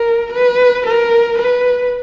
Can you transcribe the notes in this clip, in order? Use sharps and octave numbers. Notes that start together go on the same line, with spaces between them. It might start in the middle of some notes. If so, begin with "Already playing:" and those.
Already playing: A#4
B4
A#4
B4